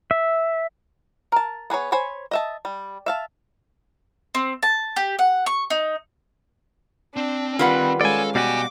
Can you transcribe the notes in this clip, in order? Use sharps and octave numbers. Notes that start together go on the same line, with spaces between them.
E5
A#4 A5
B3 G#4 A#4 C#5
C5 C#5 G#5 B5
D#5 E5 A5
G3
E5 F5 A5
C4
A5
G4
F#5
C#6
D#4
C4 D4
D#3 G3 F4 B4 F#5
G#3 C#4 A4 D5 F5 G#5
B2 G3 F#4 F5 G#5 D6